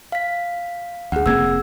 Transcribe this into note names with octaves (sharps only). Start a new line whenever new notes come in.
F5 B6
D2 G#4 F#5
F1 A#3 C4 E6 G#6